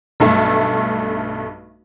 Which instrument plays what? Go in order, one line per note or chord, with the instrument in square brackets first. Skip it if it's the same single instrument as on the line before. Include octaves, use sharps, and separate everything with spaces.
[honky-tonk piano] B1 G2 A3 E5